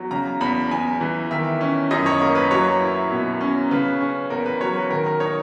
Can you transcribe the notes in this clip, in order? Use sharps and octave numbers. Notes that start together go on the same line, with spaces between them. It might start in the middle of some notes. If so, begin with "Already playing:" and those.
Already playing: E2 F#3
C#3 A#5
E2 B5
E2 G#5
E3
D#3 E5
C#4
F#2 D#5
C#5
A#3 A#4
B4
F#3 C#5
E4
B2
C#4
C#3 B4
C#4
E2 A#4
B4
F#3 C#5
B4
D#3 A#4
A#4
D#4 C#5